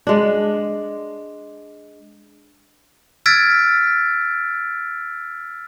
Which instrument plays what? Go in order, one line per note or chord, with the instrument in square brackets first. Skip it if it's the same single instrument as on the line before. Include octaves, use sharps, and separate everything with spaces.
[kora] G#3 D4
[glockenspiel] E6 F6 G#6 A6 B6 D7